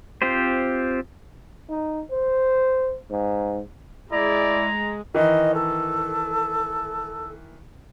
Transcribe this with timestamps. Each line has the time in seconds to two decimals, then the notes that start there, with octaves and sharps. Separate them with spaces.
0.22 C4 F4 G4 C5
1.69 D#4
2.11 C5
3.11 G#2
4.12 G#3 E4 D5 A#5
5.15 D#3 E3 D#5
5.54 A4